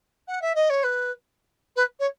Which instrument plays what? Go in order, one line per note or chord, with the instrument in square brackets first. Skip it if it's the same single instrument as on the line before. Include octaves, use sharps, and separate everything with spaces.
[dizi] F#5
E5
D#5
C#5
B4
B4
C#5